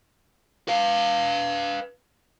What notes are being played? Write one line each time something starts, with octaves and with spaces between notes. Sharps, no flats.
B4 F5